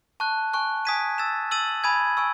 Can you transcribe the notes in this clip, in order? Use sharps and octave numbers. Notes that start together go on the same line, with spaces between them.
A5 C#6 F#6
G#5 C#6 F#6
G#5 D#6 G#6 B6 D#7
E6 A6 E7
E6 A6 D#7 F#7
G#5 B5 D#6 G#6 D#7
G#5 C#6 E6